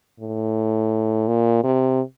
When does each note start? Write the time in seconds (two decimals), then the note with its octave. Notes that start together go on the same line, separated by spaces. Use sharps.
0.20 A2
1.28 A#2
1.64 C3